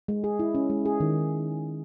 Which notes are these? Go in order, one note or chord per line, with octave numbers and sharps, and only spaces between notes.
G#3
G#4
E4
C#4
G#3
G#4
D#3